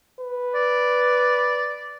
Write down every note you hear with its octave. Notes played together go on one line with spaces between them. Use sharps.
B4
D5